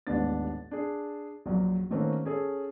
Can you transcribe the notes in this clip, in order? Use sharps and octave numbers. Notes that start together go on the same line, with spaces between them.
D#1 A1 G#2 B3 D4 A6
D4 G#4
A#1 F#2 F#3
D#3 A3 A#3 C4 C#4 F#4
C#4 G#4 A4